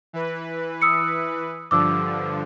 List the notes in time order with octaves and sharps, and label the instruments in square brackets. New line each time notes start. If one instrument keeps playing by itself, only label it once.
[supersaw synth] E3 B4
[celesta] D#6 E6 C#7
[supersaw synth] G2 D3 F3 [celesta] D6 E6